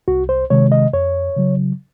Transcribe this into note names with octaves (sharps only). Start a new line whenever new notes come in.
C2 F#4
C5
C3 D#3 G#3 C#5
D#5
F2 C#5
C#3 F#3